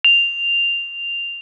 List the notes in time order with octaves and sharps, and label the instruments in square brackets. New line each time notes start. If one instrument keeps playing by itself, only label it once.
[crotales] F7